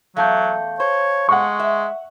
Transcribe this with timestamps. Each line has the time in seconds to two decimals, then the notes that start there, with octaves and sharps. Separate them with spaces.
0.17 E2 F#3 A3 F5 A5 G6
0.80 C5 C#5
1.29 G#3 F#5 C#6
1.59 E5